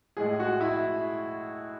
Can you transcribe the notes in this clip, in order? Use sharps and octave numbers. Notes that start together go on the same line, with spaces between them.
A2 G#3 G#4
F#4
E4